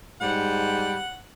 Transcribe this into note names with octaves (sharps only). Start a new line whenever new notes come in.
G#2 G3 F#5